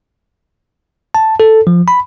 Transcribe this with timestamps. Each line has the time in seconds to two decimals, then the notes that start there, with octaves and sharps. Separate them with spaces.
1.15 A5
1.40 A4
1.67 F3
1.88 B5